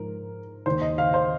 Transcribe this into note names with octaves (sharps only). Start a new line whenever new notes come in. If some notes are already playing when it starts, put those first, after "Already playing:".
Already playing: G#2 F3 A#4
D#2 D#3 C5
D#5
F5
C5